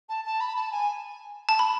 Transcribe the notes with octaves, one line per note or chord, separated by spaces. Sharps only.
A5
A5
B5
A5
G#5
A5
B5